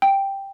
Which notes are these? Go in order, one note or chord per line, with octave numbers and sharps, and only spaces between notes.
G5